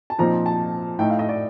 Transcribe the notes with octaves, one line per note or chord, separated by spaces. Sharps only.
A5
A#2 F3 C4 D#4 A#5
A5
A2 A3 D#4 G5
F5
D#5
D5